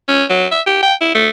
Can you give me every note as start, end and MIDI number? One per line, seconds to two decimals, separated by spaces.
0.08 0.25 61
0.29 0.46 54
0.51 0.61 76
0.66 0.78 67
0.83 0.94 79
1.01 1.12 64
1.15 1.29 57